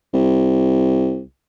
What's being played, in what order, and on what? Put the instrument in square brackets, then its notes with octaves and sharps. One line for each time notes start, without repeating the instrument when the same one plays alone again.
[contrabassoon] C2